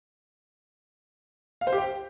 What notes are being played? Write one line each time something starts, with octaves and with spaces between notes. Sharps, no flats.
F5
C5
G4
G5